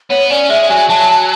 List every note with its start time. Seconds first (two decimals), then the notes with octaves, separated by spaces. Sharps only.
0.10 B3 C#5
0.29 C#4 D5
0.49 G#3 E5
0.69 F#3 G#5
0.89 F#3 A5
1.10 A5